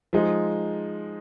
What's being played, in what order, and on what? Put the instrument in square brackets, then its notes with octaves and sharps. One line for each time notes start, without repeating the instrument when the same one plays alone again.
[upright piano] F3 G#3 D#4